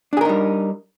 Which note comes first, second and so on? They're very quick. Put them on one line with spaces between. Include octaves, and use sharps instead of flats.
D4 G#4 A#4 D#4 G3